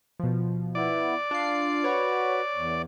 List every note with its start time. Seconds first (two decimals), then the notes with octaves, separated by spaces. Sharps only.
0.19 B2 F3
0.75 B3 E4 D5
1.31 D4 F4 C7
1.84 F#4 B4 C#5
2.55 E2